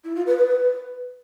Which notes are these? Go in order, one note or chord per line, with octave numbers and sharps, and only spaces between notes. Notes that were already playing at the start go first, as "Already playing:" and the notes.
E4
F4
B4
B4